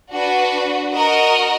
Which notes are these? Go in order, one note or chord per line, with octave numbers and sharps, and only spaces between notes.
D4 F#4 B4
F#4 A#4 D#5